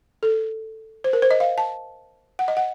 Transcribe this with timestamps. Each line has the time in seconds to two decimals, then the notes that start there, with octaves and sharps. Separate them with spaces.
0.23 A4
1.04 C5
1.13 A#4
1.22 C5
1.31 D#5
1.40 F5
1.58 A5
2.39 F#5
2.48 D#5
2.57 F#5